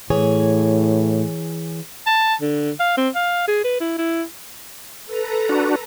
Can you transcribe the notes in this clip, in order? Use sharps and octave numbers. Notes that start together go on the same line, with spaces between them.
A2 E3 G#4 C#5
A5
D3
F5
C4
F5
G#4
B4
E4
E4
A4 B4 A#5
D4 F#4